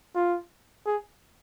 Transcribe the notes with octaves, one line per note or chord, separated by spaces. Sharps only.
F4
G#4